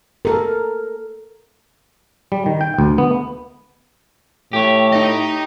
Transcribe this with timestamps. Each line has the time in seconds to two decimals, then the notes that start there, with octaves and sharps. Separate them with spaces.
0.25 A4 A#4
2.32 G3
2.46 D#3
2.61 G5
2.79 D2
2.98 B3
4.53 A2 G4 C#5
4.92 D#4 D#5